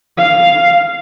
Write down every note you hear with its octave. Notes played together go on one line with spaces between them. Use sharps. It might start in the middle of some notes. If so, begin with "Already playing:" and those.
F5